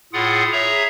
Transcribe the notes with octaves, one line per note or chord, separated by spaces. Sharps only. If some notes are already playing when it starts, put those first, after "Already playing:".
A2 F4 G#4 F#5
G#4 C#5 E5 A#5